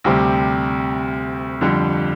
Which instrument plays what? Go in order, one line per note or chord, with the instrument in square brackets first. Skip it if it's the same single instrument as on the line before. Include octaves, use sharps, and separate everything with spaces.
[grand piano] D2 C3 G3 C4 G4
F2 D3 G3